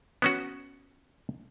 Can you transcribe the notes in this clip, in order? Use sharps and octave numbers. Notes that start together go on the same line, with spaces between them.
B3 C#4 F#4